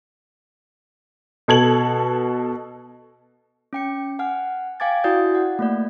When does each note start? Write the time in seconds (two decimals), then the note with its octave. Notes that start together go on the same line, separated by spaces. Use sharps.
1.48 B2 A4 G#6 F#7
3.73 C#4 G5 C#7
4.19 F#5 G#5 F6
4.80 F5 G5 G#5 D6 G#6 A6
5.04 E4 F#4 D5 D#6 G6 A6
5.35 F#5
5.59 A3 A#3 D5